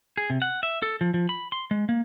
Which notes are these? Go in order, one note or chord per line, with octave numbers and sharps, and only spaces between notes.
G#4
C3
F#5
E5
A4
F3
F3
B5
C6
G#3
A#3